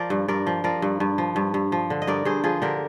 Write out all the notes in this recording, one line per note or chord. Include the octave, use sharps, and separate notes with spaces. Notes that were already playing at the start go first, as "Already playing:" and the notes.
Already playing: F3 A#4 D5
G2
G2 A#4 D5
F3
F3 A#4 D5
G2
G2
F3
G2
G2
F3
D3
D#5
G2 A#4 D5
G2 G#4 C5
F3 F4 G#4
D3 G4 A#4